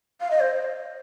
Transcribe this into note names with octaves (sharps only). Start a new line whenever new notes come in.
F5
D#5
C5